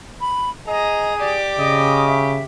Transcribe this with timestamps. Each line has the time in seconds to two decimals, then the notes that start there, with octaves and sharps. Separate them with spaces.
0.21 B5
0.67 G#4 D#5 A#5 D#6
1.20 G4 D5 D6
1.59 C#3 D#5
2.06 E5